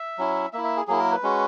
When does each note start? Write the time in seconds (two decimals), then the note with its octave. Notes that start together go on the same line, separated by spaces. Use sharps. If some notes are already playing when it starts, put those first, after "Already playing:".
Already playing: E5
0.18 F#3 C#4 E4
0.53 A#3 E4 E5
0.64 E5
0.77 G#4
0.88 F#3 A#3 E4 G#4
0.99 A#4
1.12 B4
1.23 G#3 C#4 F#4